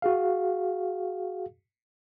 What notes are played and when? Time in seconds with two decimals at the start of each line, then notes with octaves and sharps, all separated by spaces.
0.02 F#4 G#4 F5